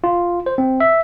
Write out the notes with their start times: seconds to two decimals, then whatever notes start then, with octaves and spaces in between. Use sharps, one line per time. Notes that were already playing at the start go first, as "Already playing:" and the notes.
0.04 F4
0.46 C5
0.58 C4
0.80 E5